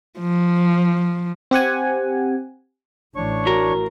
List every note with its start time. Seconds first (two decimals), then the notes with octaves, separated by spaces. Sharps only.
0.19 F3
1.51 C4 G4 F#5 G#5
3.16 A1 E3 D4 C#5 C#6
3.46 A2 F#4 A#4